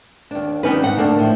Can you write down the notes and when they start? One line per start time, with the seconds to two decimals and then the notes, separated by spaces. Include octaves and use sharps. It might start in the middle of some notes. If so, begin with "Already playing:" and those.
0.31 D#2 D4
0.63 D#3 G3 B3 C#4 D#4 B4
0.82 G#2 D#4 F#5
0.97 D2 A3 A#3 D4
1.19 A2 F3